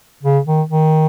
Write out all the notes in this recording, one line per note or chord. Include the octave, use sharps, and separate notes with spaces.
C#3
D#3
D#3